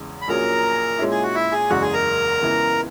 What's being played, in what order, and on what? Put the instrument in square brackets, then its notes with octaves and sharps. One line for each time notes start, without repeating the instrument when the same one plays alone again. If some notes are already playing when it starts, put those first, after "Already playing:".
Already playing: [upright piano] E2 C#3 G#3
[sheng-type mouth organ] B5
[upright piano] A#1 A#2 F#3 C#4 G#4 [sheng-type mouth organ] A#4 A#5
[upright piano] A#2 G#3 C#4 E4
[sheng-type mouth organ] G#4 G#5
F#4 F#5
E4 E5
G#4 G#5
[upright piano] F#1 E2 C#3 G#3 [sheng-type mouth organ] F#4 F#5
[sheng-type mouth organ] G#4 G#5
A#4 A#5
[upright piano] C#2 C#3 E3 B3 E4